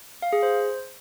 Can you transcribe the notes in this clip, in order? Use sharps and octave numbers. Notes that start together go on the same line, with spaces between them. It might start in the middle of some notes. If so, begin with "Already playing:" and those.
F5
G#4
C5